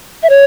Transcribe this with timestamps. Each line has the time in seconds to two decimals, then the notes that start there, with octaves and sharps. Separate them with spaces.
0.23 E5
0.29 C#5